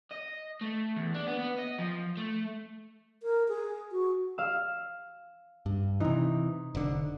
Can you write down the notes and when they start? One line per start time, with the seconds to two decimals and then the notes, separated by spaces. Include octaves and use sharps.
0.12 D#5
0.61 A3
0.97 E2
1.15 D4
1.27 B3
1.38 B3
1.58 D#5
1.78 F3
2.17 A3
3.23 A#4
3.48 G#4
3.92 F#4
4.38 F5 E6
5.66 G2
6.00 C3 E3 D#4
6.75 F1 D3